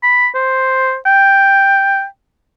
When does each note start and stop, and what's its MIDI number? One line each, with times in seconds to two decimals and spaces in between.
0.03 0.28 83
0.35 0.96 72
1.06 2.05 79